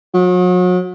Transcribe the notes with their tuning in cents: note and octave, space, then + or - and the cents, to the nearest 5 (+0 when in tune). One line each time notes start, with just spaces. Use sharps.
F#3 -40